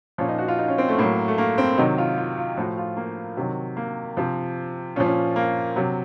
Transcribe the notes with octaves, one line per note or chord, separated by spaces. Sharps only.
A#2 F3 C#4
D#4
F#4
F4
D#4
C#4
C4
A3
A2 F#3 A#3
A3
A#3
C4
C3 D#3 F#3 D#4
F4
F4
F4
A2 F3 F#4
F4
A#3
C3 D#3 F#3
A#3
C3 F3
A#2 F3 C#4
C#4
A#3
C3 F#3